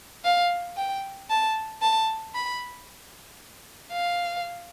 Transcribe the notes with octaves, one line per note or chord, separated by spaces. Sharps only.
F5
G5
A5
A5
B5
F5